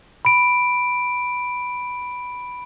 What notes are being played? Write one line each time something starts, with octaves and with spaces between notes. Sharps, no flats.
B5 D7